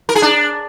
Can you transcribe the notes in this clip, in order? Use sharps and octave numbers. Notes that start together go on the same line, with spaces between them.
A#4
G#4
D4